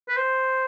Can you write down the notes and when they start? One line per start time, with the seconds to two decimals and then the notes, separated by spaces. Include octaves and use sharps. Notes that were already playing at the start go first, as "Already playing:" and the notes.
0.09 B4
0.17 C5